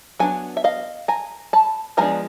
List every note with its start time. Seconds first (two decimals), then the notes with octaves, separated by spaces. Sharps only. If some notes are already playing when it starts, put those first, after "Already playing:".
0.19 F#3 B3 D4 G#5
0.57 E5
0.64 D#5 F5
1.08 G#5 A#5
1.53 A5 B5
1.97 F3 G#3 B3 D4 G#5 A#5